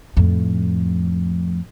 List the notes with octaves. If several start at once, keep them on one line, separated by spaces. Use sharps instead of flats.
F2 A2